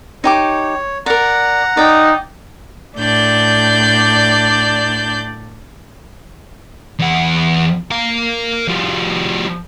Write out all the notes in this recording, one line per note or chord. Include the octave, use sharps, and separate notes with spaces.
D#4 G4 C#5 D6
A#4 D5 F#5 A#5
D#4 D5 G5
A2 D4 D5 G6
E2 F#5
A#4 F5
F3 G3